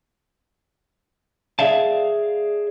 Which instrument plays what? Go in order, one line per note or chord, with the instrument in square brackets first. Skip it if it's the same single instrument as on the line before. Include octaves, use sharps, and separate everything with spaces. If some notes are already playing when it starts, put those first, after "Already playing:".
[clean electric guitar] G#4 A4 D5 E5 F5 A5